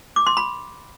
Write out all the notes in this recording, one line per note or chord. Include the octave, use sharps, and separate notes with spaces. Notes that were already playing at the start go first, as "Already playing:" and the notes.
D6
C6
B5